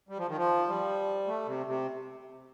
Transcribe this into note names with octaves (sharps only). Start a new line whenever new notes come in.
G3
F3
D#3
F3
G3
A3
C3
C3